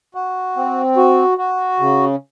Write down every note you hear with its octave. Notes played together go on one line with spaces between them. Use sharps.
F#4
C4
F#4
F#4
C#3